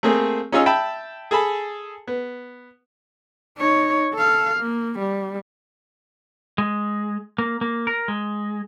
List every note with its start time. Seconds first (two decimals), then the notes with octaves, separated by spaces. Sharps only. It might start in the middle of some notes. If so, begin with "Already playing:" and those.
0.03 A3 A#3 C4 G#4
0.52 C#4 D#4 F4 G#4 E6
0.66 E5 G5 A5 B5
1.31 G#4 A4 A5 B5
2.07 B3
3.57 D#4 C#5
4.14 A4 F5
4.60 A#3
4.99 G3
6.58 G#3
7.38 A#3
7.61 A#3
7.87 A#4
8.08 G#3